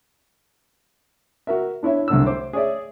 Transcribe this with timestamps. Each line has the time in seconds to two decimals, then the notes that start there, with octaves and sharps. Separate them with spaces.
1.47 F#4 A#4 E5
1.83 D4 E4 C#5 E5
2.08 C2 D3 E6
2.26 C5 D6
2.53 G#4 C#5 D5 E5